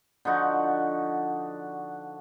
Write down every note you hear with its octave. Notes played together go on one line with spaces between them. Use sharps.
D3 F3 D#4 F#4